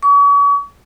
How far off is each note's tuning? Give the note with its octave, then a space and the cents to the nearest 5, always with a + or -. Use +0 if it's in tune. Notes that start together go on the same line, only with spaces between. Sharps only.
C#6 +40